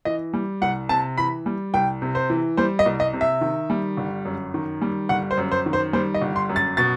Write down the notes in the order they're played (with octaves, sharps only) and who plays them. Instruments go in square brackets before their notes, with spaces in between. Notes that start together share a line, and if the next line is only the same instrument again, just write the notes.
[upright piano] E3 D#5
G3
C2 F#5
C3 A5
E3 B5
G3
C2 G5
C3
C5
E3
G3 C5
D#5
C2
D#5
C3
E5
D#3
G3
G1
F#2
D#3
G3
G1 F#5
C5
F#2
C5
D#3
C5
G3 C5
D#5
G1
C6
F#2
A6
B2 A6